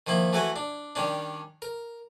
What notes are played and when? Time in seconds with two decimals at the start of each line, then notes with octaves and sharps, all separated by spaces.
0.07 D#3 F3 A#3 E4
0.33 E3 A3 F#4 A4 G#5
0.56 D4
0.96 D#3 G3 C#4 D4
1.62 A#4